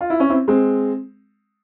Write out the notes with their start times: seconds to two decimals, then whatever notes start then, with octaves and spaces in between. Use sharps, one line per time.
0.01 F4
0.10 E4
0.20 C#4
0.30 C4 E4
0.48 G#3 C4